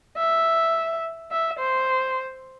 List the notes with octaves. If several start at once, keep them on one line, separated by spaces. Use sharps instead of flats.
E5
E5
C5